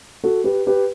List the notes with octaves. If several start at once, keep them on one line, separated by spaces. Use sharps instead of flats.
F#4 A4
G4 B4
G4 B4